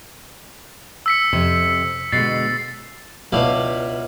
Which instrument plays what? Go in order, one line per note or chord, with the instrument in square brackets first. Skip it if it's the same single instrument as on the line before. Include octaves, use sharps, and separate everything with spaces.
[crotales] E6 B6 C#7
[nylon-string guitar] F2 C3
[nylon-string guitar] B2 D3 G#3 [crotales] A6 C7
[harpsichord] C#2 B2 D4 E4 F5 B5